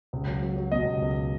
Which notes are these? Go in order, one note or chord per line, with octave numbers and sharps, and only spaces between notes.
C#2
F#3
F#3
F#3
B2 D#5
C#2
C#2